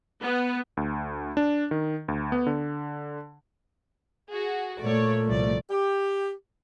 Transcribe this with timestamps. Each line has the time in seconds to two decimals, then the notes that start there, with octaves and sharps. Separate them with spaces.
0.22 B3
0.77 D2
1.37 D4
1.71 D#3
2.08 D2
2.32 B3
2.47 D3
4.30 F#4 G#4
4.80 A#2 A3 C#5 D5
5.27 C2 F3 D5
5.70 G4